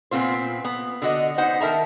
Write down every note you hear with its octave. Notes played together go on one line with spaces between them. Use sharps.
A#2 B3 C4 F4 C5
B3
D3 F#4 D#5
B3 D#4 C5 F#5
D#3 A#4 E5 A5 A#5